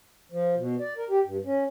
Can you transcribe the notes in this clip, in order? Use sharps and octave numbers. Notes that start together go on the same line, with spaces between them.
F3
B2
D5
A#4
G4
G2
C#4